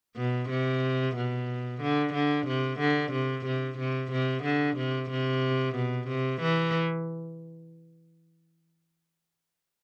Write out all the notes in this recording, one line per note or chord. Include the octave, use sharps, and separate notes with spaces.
B2
C3
B2
D3
D3
C3
D3
C3
C3
C3
C3
D3
C3
C3
B2
C3
E3